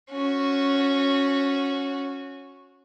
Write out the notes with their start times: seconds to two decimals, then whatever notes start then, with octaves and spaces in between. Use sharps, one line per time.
0.10 C#4 F#4